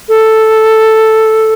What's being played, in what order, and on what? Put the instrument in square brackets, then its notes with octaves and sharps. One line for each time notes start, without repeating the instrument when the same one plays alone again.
[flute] A4